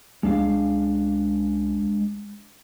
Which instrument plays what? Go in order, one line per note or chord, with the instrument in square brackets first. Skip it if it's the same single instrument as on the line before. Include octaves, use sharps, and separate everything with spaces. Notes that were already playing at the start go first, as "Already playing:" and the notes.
[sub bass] C#2 [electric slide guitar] G#3 D4 F5